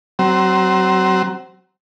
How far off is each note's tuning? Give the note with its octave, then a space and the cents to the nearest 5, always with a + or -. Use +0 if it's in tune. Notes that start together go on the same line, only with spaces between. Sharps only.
F#3 +30 C4 +0